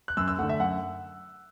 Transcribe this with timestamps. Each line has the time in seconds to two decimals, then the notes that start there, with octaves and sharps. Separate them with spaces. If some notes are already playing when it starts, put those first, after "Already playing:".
0.08 F#6
0.17 F#2 E6
0.28 E6
0.38 A3 F#5
0.42 D3
0.49 E5
0.59 F#2 F#5